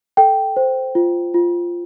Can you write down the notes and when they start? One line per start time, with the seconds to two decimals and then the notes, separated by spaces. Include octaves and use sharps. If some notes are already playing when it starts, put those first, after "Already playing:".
0.17 A4 G5
0.57 C5
0.95 F4
1.34 F4